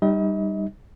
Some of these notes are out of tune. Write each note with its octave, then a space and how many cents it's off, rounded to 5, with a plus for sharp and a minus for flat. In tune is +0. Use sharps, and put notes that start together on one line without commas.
G3 +0 D#4 -25 D#5 +40